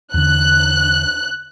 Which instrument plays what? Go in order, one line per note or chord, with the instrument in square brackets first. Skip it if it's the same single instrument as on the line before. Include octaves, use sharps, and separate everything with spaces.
[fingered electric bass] E2 D3 [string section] F#6